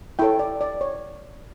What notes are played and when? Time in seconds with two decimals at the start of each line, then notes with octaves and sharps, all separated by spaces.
0.19 E4 A4 C#5 G5
0.39 D5
0.61 D5
0.81 C#5